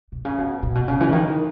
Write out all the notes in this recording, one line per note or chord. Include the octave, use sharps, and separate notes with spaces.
B2
C#3
B2
A#2
B2
C#3
E3
C#3
D#3